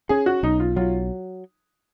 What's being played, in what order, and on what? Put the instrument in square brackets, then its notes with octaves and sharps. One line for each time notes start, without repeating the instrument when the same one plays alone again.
[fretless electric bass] C#4 [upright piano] G#4
[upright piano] F#4
[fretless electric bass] B1 [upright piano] D#4
[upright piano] F4
[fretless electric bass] F#3 [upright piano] F4